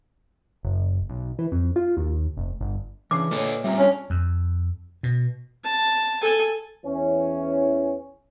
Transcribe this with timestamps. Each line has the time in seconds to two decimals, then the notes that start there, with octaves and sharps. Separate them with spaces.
0.63 F#1
1.09 B1
1.39 E3
1.52 F2
1.76 F4
1.97 D#2
2.37 F1
2.61 G1
3.11 C#3 E3 D4 D6 C7
3.31 A#2 D4 A4 B4 C#5 D#5
3.64 G3 C4 F4 E5 A#5
3.78 C#4 D4
4.10 F2
5.03 B2
5.64 A5
6.22 A4 G#5
6.85 E2 E3 C#4